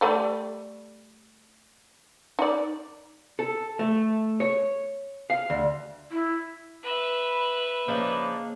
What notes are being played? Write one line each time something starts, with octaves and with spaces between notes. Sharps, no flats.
G3 A3 D5
D#4 D5
A4
A3
C#5
F5
D2
E4
B4 E5
C#3 F3 A#3 D4 D#4